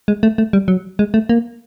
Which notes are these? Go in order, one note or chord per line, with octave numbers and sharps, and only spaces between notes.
G#3
A3
A3
G3
F#3
G#3
A3
A#3